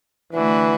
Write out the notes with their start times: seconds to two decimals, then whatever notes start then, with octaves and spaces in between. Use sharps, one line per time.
0.33 D3 E3 A3 D4 F#4 B4